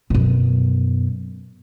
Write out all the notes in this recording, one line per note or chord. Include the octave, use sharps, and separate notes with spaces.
F#2 B2